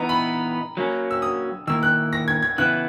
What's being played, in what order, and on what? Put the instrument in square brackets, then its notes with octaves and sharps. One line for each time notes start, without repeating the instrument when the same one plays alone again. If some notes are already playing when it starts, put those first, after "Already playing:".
Already playing: [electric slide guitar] E3 B3 D#4 [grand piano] A#5
[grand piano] B5
[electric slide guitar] F#3 A#3 C#4
[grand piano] E6
D#6
[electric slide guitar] D#3 A#3 E4 [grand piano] E6
[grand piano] F#6
A#6
G#6
G#6
[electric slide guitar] C#3 E3 B3 E4 [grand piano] F#6